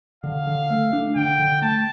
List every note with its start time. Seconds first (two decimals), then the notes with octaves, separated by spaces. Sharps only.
0.24 D3 F5
0.47 D3
0.70 A3
0.93 D4
1.15 D3 G5
1.40 D3
1.62 A3 A5